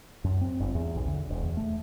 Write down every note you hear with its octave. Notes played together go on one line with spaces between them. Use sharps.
F#2
C4
G1
E2
B1
D3
E1
E2
A3